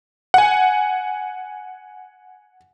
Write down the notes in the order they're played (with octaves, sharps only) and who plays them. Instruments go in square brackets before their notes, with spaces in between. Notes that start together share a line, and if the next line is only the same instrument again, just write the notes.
[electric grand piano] F#5 G#5